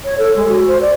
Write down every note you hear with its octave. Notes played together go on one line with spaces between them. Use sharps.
C#5
A4
G#3
F#4
C5
D5